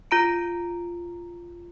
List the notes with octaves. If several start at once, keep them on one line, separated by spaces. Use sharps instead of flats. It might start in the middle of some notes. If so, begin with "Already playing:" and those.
F4 A#5 D7